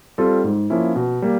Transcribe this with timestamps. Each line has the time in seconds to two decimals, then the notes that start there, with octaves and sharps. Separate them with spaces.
0.18 G3 C4 F4 A4
0.44 G#2
0.70 F3 A#3 C#4 E4
0.96 B2
1.22 G3 A#3